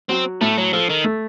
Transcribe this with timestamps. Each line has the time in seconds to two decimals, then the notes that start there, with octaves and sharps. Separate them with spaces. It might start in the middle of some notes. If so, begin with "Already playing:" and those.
0.09 F#3 C4
0.41 A2 A3
0.58 F#3
0.73 F3 A4
0.89 D#3
1.04 A3